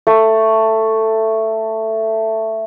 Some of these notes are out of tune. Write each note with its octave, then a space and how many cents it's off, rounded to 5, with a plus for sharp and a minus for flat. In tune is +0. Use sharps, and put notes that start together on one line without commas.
A3 +10